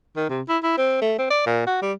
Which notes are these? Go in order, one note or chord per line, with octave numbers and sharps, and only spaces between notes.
D#3
C3
E4
E4
C4
A3
C4
D5
A#2
F#4
G3